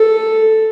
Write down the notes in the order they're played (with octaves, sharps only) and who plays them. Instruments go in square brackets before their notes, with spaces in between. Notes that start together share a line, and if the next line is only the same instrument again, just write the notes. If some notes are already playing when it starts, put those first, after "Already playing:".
Already playing: [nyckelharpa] A4